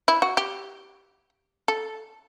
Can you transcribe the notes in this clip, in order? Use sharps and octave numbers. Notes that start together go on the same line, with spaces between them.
E4
F#4
G4
A4